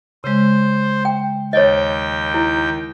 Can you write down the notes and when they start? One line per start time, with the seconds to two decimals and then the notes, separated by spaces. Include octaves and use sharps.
0.24 C#3 G#3 C5
1.05 G5
1.53 D#2 C#5 D#5 G5
2.34 E4